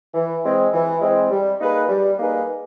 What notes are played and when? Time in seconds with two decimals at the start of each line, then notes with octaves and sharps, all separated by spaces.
0.14 E3
0.44 G#3 C4
0.73 E3
1.01 G#3 C4
1.30 G3
1.59 A#3 D#4 G#4 B4
1.89 G3
2.18 A#3 D#4 G#4 B4